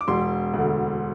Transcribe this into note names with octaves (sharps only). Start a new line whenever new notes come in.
D6
E1 C6
D2 D3